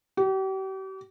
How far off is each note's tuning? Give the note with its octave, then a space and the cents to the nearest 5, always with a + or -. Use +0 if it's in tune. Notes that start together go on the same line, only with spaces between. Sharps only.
G4 -40